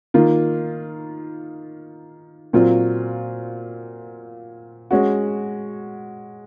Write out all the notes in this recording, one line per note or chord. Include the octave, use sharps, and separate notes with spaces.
D#3 A#3 F4
A#2 F#3 C4 F4
G#3 C#4 F#4